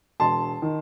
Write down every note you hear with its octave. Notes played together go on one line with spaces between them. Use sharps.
E1 A5 C6
D#3